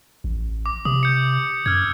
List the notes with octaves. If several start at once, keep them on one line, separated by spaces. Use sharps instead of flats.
A1
D6
C3 D#6
G6 C#7
F#2 E6 F6 G#6